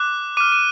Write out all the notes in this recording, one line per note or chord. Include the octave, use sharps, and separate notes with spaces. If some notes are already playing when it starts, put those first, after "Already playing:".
Already playing: D6 F#6
D6 F6 D#7
D#7